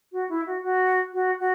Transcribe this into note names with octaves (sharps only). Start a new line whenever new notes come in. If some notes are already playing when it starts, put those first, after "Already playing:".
F#4
E4
F#4
F#4
F#4
F#4